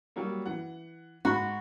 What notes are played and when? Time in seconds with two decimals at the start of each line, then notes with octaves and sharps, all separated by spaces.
0.16 F#3 G3 A#3
0.46 E3 F#5
1.25 G#2 F#4 B5